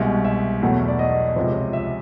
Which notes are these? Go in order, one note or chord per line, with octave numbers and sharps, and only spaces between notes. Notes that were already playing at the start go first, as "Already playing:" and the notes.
Already playing: C2 B2 G#3 E5
E5
E2 B2 F#3 A3
D5
D#5
C#2 C3 F3
E5